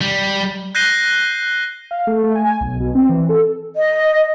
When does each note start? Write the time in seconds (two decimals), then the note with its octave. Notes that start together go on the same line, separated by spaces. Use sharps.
0.01 G3
0.75 F#6 G6 A#6 C7 D#7 G7
1.91 F5
2.07 A3
2.24 A3
2.35 G#5
2.61 B1
2.80 B2
2.95 C4
3.09 E3
3.29 A4
3.76 D#5